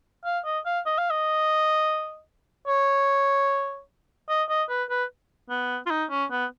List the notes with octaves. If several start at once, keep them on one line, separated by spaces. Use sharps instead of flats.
F5
D#5
F5
D#5
F5
D#5
C#5
D#5
D#5
B4
B4
B3
F4
D#4
C#4
B3